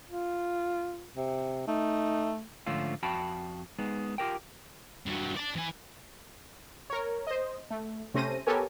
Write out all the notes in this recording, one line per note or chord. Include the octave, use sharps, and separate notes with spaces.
F4
C3
A3 D#4
G#2 D3 F3 A3 C#4 F4
F2 F#4 F5 G5 A5 B5
G#3 B3 D#4 G#4
F4 G4 A#4 G5
G2 F#3
D5 A5
E3 G#5
A#4 C#5
C5 D#5
A3
C3 A3 C#4 C5 A#6 D#7
B3 G4 A4 A#4 C#5 G#5